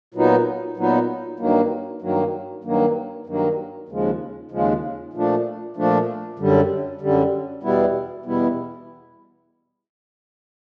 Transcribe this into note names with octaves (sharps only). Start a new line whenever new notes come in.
A#2 F#3 B3 D#4
A#2 F#3 B3 D#4
G2 D#3 F#3 A#3
G2 D#3 F#3 A#3
G2 D#3 F#3 A#3
G2 D#3 F#3 A#3
D#2 C#3 F3 G#3
D#2 C#3 F3 G#3
A#2 F3 A3 D4
A#2 F3 A3 D4
F#2 D3 G3
F#2 D3 G3
E2 B2 G3 B3 E4
E2 B2 G3 B3 E4